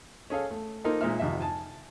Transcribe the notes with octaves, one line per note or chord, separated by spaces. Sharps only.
C#4 G#4 A4 F5
A3
A#3 D#4 F4 A4 A#4 C5
A#2 G#3 D#4 C5 E5 F6
G#1 F2 C3 D#5 E5
G#5 A5